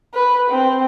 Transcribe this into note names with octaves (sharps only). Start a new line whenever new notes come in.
B4
C4